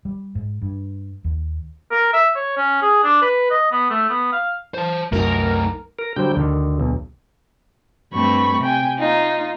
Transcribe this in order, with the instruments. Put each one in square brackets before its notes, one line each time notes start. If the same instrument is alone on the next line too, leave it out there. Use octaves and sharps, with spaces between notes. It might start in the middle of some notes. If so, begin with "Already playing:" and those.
[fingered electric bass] G3
G#2
G2
D#2
[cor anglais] A#4
E5
C#5
C#4
G#4
D4
B4
D#5
B3
A3
B3
F5
[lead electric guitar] C5 A5
[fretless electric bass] C2 F#2 [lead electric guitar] A3 D#4 [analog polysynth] A#4
[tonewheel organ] A#4
[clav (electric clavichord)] D3 C5 [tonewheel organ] F#3 G3 G5
[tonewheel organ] D2 [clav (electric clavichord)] D3 D#3
[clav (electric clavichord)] B1
[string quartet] G2 A3 C4 B5 C#6
C3 G5 G#5
A#3 D#4 F4